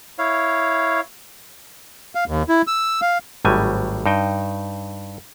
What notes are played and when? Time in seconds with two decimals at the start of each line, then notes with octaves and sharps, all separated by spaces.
0.19 E4 C#5 F5
2.15 F5
2.27 D#2
2.49 E4
2.67 E6
3.02 F5
3.45 G#1 A2 F#3 G3 G#5
4.06 G2 D#4 G5